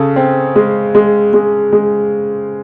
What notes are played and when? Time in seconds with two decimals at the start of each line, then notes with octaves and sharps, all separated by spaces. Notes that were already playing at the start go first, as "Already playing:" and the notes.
Already playing: C#3 A4
0.16 C4
0.56 G#3
0.95 G#3
1.33 G#3
1.73 G#3